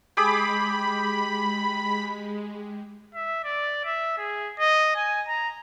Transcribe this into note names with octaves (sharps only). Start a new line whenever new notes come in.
G#3 G4 G#4 B5 D6
E5
D5
E5
G#4
D#5
G#5
A#5